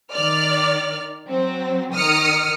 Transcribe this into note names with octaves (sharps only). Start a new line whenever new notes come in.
D#3 D5 F6
F#3 C4
D#3 D#6 F6 C#7